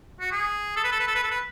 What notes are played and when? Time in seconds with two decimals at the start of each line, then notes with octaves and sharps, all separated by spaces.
0.20 F#4
0.32 G#4
0.76 A4
0.84 B4
0.92 A4
1.00 B4
1.08 A4
1.15 B4
1.23 A4
1.31 B4